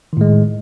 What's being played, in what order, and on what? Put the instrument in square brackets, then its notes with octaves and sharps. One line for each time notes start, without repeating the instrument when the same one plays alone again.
[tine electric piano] D#3
A2
G#3